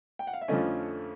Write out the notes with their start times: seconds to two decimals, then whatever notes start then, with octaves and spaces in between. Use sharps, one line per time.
0.19 G5
0.27 F#5
0.33 F5
0.42 E5
0.48 F2 D3 F3 A3 C#4 D#5